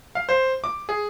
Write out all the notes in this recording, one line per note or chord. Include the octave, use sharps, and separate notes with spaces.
F5
C5
D6
G#4